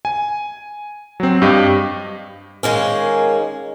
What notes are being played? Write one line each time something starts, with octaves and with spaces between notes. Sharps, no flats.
G#5
F#3 C4
G2 G4 D#5 F5
D#3 G#3 A#3 C#4